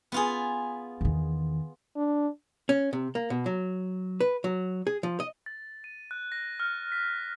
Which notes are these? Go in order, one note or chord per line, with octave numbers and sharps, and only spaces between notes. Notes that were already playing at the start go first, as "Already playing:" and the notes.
B3 F4 G#4
E2 D#3
D4
C#4
C3
A#3
B2
F#3
B4
F#3
G#4
F3
D#5
A6
D#7
F#6
A#6
F6
B6